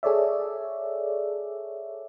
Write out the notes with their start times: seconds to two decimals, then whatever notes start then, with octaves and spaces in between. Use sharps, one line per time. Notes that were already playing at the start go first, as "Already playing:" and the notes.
0.03 G#4 A4 C#5 D5 E5